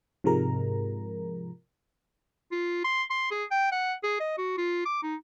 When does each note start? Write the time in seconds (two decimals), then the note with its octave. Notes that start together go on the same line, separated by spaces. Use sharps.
0.24 G#2 C3 F3 G#3 A#4 A#5
2.52 F4
2.84 C6
3.10 C6
3.31 G#4
3.51 G5
3.72 F#5
4.03 G#4
4.20 D#5
4.37 F#4
4.58 F4
4.85 D6
5.03 D#4